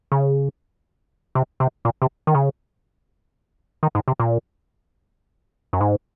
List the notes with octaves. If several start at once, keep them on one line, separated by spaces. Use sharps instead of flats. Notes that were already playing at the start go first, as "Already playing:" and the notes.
C#3
C3
C3
A#2
C3
D#3
C#3
D#3
G#2
C3
A#2
F#2
G#2